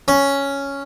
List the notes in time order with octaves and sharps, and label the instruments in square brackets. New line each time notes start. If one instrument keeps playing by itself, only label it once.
[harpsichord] C#4